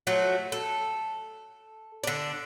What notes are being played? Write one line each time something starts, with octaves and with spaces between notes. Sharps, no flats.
F3 F#3 A3 F#4
A4
D3 D4